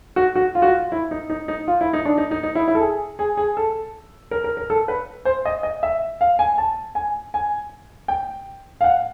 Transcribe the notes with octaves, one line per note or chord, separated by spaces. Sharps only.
F#4
F#4
F4
F#4
F4
E4
D#4
D#4
D#4
F4
E4
D#4
D4
D#4
D#4
D#4
E4
E4
A4
G#4
G#4
G#4
A4
A#4
A#4
A#4
A4
B4
C5
D#5
D#5
E5
F5
G#5
A5
G#5
G#5
G5
F5
F#5